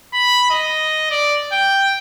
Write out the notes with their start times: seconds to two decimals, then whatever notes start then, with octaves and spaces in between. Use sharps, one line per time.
0.14 B5
0.50 D#5
1.11 D5
1.52 G5